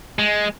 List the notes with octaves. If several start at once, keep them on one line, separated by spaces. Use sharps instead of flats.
G#3